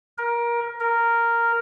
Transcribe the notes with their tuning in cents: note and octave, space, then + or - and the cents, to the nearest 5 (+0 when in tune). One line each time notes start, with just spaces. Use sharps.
A#4 +20
A#4 -5